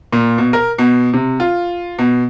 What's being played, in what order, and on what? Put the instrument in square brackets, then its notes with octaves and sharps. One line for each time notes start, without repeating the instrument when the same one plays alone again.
[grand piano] A#2
B2
A#4
B2
C3
F4
B2